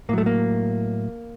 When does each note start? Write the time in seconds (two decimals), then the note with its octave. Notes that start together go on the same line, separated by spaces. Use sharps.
0.09 A2 A#3
0.13 F#3 A3
0.26 A#3